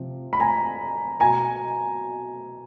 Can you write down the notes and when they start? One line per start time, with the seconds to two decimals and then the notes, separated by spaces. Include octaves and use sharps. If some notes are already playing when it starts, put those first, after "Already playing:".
Already playing: C3 F3
0.33 B5
0.40 G#5 A#5
1.20 B2 G#5 A#5